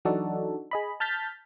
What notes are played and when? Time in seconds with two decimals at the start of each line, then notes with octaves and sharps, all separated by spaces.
0.05 E3 F#3 D4 D#4 F#4 A4
0.71 G#4 D#5 B5
1.00 A5 F6 G6 A6 B6